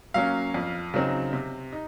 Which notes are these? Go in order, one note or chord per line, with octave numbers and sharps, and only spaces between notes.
F#3 A#3 C#4 F5
F2
C#3 F#3 C4 D#4
C3
D#4